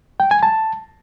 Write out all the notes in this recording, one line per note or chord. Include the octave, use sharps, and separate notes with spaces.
G5
G#5
A5